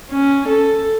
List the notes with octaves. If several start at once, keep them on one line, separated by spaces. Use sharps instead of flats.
C#4
A4